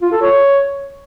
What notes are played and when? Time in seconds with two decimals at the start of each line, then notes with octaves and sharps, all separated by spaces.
0.02 F4
0.12 A4
0.22 C#5